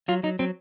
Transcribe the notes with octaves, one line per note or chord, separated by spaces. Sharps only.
F#3 F4
F#3 D#4
F#3 C4